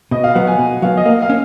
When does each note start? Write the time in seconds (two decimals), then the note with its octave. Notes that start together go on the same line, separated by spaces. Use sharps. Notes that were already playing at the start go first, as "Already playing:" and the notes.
0.11 B2 D#5
0.24 F5
0.35 F#3 B3 F#5
0.47 G#5
0.59 B2 F#5
0.82 F#3 B3 F5
0.97 D#5
1.05 A#3 F5
1.22 F5
1.30 C#4